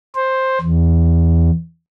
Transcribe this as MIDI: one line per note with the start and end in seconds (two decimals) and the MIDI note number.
0.15 0.59 72
0.61 1.50 40